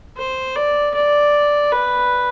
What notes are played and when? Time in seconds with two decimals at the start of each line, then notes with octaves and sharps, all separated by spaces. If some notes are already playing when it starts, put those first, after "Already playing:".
0.17 C5
0.56 D5
0.95 D5
1.72 B4